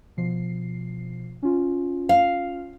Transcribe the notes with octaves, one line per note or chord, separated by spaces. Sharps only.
B2 F3 C7
C#4 F4
F5